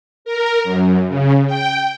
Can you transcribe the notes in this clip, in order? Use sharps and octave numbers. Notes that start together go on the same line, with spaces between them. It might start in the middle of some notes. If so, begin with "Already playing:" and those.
A#4
F#2
C#3
G5